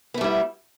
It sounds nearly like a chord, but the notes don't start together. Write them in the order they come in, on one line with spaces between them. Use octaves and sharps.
B3 A3 G3 E4